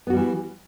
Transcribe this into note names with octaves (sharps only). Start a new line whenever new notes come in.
E3 G3 B3 F#4